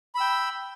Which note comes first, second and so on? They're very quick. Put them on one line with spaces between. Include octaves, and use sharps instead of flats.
B5 E6 G5